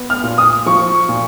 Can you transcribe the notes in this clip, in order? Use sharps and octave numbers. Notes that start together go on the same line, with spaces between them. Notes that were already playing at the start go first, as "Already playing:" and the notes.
Already playing: B3
F6
A#2
D#6
F3 C#6
A#2